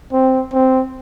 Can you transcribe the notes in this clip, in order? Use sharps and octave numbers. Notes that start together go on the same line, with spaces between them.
C4
C4